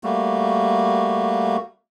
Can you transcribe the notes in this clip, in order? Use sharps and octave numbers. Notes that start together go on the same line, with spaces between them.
G3 A3 A#3 F#4